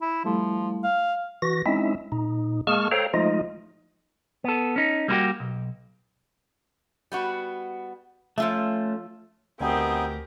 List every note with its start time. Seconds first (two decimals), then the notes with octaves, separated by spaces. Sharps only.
0.01 E4
0.25 F3 G3 A3 E4
0.84 F5
1.42 E3 F#4 A#6
1.66 G#3 C4 C#4 D#4 E4 E5
2.12 A#2 D#4
2.67 G#3 A#3 G#4 A5 C#6 F6
2.92 A4 C5 C#5 F5 G5 A#5
3.14 F3 G#3 A3 D#4 F4 D#5
4.44 B3 A4
4.76 C#4 D#4
5.08 G3 A#3 C4 E4 F#4 G4
5.40 B1
7.12 G3 B3 F#4
8.38 F3 A3 C#4 F4 E5
9.61 D2 B3 C4 D#4 G4 A#4 G#5